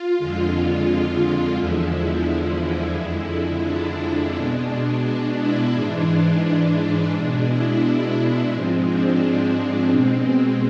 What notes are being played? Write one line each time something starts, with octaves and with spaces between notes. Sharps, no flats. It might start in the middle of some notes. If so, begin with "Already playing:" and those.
Already playing: F4
F2 D3 G#3
E2 D3 F3 G#3 E4
F2 D3 G#3
D4
B2 G#3
D4
E4
G#2 E3 G#3 D4
B2 G#3 D4
E4
D4
D4
G#2 F3 G#3 C4
D4
C4
B2 G#3